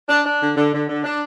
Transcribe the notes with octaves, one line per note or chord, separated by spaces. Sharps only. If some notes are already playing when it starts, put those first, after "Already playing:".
D4
D4
D3
D3
D3
D3
D4